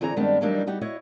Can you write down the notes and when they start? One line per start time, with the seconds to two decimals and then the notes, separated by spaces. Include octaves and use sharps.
0.01 D3 E3 C4 G#4 C#5 A#5
0.16 G2 D#3 G#3 B3 C4 D4
0.41 E3 F#3 G3 A#3 D4 D#4
0.67 G3 D#4 F#4 G4
0.81 E4 F#4 C#5 D#5